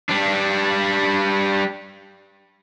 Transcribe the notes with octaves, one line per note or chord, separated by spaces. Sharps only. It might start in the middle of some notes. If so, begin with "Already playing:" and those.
G3 D4